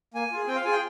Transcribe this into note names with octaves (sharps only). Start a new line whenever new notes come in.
A#3 G#5
F4 G#4
C4 G5
F5
F4 G#4 G#5
G5